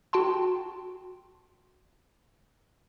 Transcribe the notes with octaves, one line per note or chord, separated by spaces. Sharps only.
F#4 G5 A5 C6